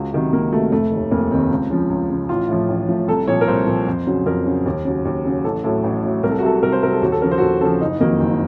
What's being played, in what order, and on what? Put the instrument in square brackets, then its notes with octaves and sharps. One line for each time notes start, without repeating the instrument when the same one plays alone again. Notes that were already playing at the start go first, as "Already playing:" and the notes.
Already playing: [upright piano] C#2 F#4
C3 D#3 F#3
C#2 A#3
C3 D#3 F#3 A3
F1 A3
D#2 D#3
F1 A#3
D#2 D#3 C4
C#2
C#3 F3
C#2
C#3 F3
A1 F4
A2 F3
A1
A2 F3
C2 A4
A#2 F3 C#5
A#4
C2 C5
A#2 F3
F2
C#3 F#3
F2 A#4
C#3 F#3
D#2
C#3 F#3
D#2
C#3 F#3
A1 A4
A2 F#3 A4
A1
A2 F#3
C2 A#4
A4
F#4
C3 F#3 A4
C2 A#4
C5
C3 F#3 A#4
A4
D#2 F#4
A4
C#3 F3 A#4
C5
F#4
D#2 A4
C#3 F3 A4
F#1 D#4
F2 D#3 F#3 A#3
F#1 C4